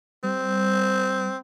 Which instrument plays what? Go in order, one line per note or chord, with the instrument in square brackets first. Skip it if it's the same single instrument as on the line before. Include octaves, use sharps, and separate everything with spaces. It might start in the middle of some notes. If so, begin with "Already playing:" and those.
[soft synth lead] G3 [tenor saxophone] C4